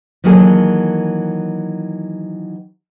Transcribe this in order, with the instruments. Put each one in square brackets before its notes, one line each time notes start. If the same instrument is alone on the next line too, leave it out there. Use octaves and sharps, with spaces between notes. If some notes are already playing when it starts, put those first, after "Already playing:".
[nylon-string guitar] D#3 E3 F#3 A#3 G#4 A4